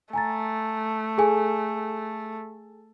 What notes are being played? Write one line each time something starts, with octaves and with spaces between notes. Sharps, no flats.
A3 G#5 A#5 A6
G#4 A4 G#5